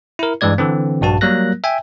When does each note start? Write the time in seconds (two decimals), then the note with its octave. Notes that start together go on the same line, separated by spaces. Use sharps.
0.19 E4 A#4
0.41 G2 E3 G#3 D5 G#6
0.58 D3 E3 C4
1.01 A#1 G2 F#4 A5
1.21 F#3 G3 A#3 A#4 F#6 A#6
1.64 E5 G5 G#5